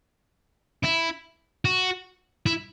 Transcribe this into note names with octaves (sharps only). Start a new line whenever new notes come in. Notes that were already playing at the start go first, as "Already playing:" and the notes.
E4
F#4
E4